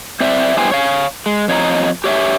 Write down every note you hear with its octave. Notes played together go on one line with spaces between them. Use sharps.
C4 C5 D5 E5
G2 B3 E4 G4 C5 G#5
C#5 F5
G#3
F2 C#5 D#5 A#5
G4 C#5 D#5 E5